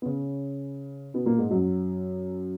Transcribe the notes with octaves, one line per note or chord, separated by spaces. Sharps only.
B3
C#3 C#4
B2 B3
A#2 A#3
G#2 G#3
F#2 F#3